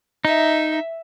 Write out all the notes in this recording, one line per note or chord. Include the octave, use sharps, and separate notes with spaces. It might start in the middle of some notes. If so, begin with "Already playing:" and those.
D#4 E5